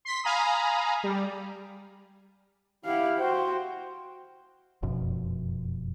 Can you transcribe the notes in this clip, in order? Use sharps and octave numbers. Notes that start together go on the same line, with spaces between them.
C6 B6
F5 G#5 A#5 B5 D#6
G3
E4 G4 F5 F#5
F#4 C5 G5
F1 F#2 B2 F3